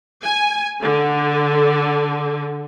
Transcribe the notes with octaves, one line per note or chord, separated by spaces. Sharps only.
G#5
D3